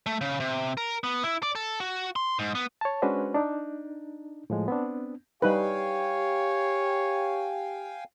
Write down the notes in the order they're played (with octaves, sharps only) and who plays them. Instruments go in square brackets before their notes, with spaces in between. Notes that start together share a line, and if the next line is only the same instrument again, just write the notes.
[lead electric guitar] A3
C#3
C3
A#4
B3
E4
D5
A4
F#4
C6
G#2
B3
[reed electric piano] C#5 A5
G#3 C#4 D4 F#4 B4 C5
D4 D#4
A2 F3 G#3
B3 C4 D4
[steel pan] G3 D#4 B4 [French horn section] G4 [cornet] C#5 [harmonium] F5 G5 G#5